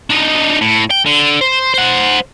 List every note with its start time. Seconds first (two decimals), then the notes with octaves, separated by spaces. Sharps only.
0.10 D4 D#4
0.61 A2
0.91 G5
1.06 D3
1.41 C5
1.74 C5 F#5